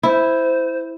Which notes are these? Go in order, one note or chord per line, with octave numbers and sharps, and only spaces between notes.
E4 C5